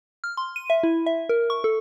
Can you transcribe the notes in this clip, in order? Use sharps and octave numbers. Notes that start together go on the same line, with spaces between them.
F6
C6
D#7
E5
E4
E5
A#4
C#6
A4